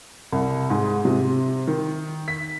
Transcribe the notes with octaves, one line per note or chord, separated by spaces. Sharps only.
C2
G#2
C3
D#3
B6